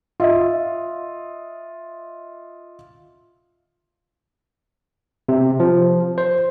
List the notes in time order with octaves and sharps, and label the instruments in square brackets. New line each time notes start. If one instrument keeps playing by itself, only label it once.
[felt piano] F4 D#5 E5
[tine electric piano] C3
F3
C5